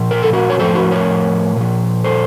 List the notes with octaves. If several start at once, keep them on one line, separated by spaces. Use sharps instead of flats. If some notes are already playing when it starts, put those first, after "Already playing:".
Already playing: A#2 F3
A#4
A4
F#4 A#4
C#5
A2 F3 A4 C5
F#4 A#4
A#4 C#5
A#2 F3
A4 C5